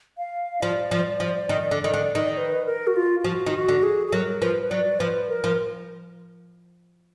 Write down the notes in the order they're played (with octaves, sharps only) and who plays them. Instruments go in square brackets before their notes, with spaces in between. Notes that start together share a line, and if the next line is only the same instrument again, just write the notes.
[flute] F5
[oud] F3 [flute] D5
[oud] F3
F3
D#3
D3
D#3
D3
D#3
[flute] B4
A#4
F#4
F4
F4
[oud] F3 [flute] F#4
[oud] D#3
[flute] F#4
[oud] D3
[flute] G#4
G#4
[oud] F#3 [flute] A#4
[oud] F3 [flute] B4
[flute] B4
[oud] F#3 [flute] D5
[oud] F3 [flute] B4
[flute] A#4
[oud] F3